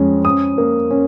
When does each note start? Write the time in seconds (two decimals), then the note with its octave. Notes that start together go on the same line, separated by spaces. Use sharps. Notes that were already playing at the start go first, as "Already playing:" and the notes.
Already playing: F2 G#3 C#4
0.24 C#4 D#6
0.58 A#3
0.91 C#4